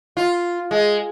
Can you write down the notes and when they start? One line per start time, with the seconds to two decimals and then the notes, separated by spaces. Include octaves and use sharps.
0.17 F4
0.71 G#3